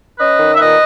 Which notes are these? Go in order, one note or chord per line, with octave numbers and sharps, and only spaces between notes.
C#4 B4 D#5
D#3
E5
A#2 B4 D#5